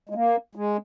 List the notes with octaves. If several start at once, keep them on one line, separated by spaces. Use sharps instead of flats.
G#3
A#3
G#3